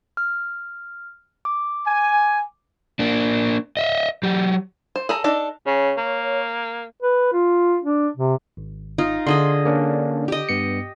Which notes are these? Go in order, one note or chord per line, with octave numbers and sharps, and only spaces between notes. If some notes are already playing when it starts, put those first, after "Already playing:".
F6
D6
G#5
A#3 D4
D#5 E5
F#3 G4
C5
G#4 A4 A#5
D4 D#4 A4
C#3 C#5
A#3
B4
F4
D4
C3
G#1
D#4 F4
D3 G#4 D#5 C6
A#3 C#4 D4
G4 D#5
G2 B3 C#7